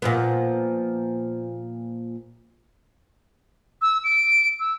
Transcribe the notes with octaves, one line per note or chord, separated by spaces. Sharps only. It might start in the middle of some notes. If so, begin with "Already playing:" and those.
A#2 F3 B3
E6
D7
E6